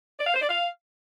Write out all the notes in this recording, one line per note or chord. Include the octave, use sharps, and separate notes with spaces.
D5
F5
C5
D5
F5